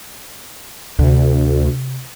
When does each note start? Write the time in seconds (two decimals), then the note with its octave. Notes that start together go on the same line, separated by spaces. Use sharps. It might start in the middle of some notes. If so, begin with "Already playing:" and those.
0.99 D2 C3